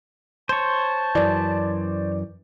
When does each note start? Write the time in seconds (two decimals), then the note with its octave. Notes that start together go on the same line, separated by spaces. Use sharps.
0.49 C5 C#5 A5
1.15 F#2 E3 D5